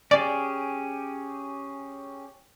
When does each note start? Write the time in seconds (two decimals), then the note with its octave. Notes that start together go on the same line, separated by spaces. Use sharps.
0.11 C#4 G4 G#4 D5